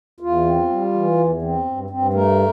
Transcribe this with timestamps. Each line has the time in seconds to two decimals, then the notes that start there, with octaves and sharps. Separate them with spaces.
0.20 E2 F4
0.45 C4
0.69 G3
0.93 E3
1.18 E2
1.42 C4
1.65 G2
1.90 G2 C4
2.14 A3 A#4